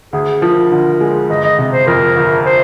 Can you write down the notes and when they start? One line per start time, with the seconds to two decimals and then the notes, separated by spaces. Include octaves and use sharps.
0.13 D2 G#4
0.42 F3 A#4
0.71 D3
1.01 G#3
1.30 G1 D#5
1.44 D#5
1.59 C3
1.73 C5
1.87 F2 A#4
2.16 G1
2.46 C5